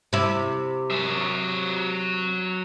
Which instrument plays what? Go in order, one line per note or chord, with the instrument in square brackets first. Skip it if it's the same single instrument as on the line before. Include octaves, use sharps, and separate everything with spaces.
[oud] C3 E4
[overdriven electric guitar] F#3 E5